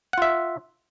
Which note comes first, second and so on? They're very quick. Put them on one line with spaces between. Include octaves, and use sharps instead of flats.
F#5 F4 E5